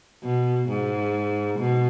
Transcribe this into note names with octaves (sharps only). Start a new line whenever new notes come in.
B2
G#2
B2